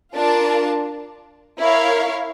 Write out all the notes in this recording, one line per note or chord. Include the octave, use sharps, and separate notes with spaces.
D4 F4 A#4 D5 A5
E4 A#4 C#5 F5